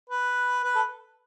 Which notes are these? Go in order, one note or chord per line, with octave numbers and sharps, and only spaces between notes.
B4
B4
A4